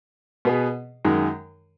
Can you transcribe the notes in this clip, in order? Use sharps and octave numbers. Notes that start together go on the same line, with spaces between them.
B2 B3 G#4
F#2 D#3 G#3